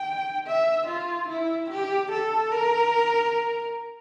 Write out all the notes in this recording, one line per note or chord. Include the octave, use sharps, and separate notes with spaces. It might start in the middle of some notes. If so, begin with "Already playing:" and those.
Already playing: G5
E5
F4
E4
G4
A4
A#4